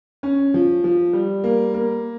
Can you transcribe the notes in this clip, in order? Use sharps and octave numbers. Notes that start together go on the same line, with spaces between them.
C#4
F3
F3
G3
A#3
A#3